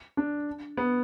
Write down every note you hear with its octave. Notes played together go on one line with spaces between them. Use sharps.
D4
B3